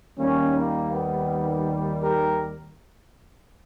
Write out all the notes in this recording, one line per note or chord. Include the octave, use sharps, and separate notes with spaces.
D#2 D#3 G3 A#3 C#4
A#3
B3
G4 A#4